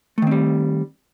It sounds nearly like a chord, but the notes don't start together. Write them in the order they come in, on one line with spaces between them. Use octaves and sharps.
A3 D#3 C4 G3